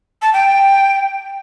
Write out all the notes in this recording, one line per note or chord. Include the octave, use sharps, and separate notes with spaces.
A5
G5